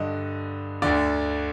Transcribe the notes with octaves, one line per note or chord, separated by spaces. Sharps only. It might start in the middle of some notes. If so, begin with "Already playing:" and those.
Already playing: G2 D3 D#5
D2 D3 D5